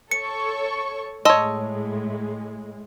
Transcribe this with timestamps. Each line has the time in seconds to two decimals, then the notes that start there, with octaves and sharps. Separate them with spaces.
0.11 A4 C#5 C#6 C#7
1.25 A2 G#3 C#5 D#5 A5 C6 E6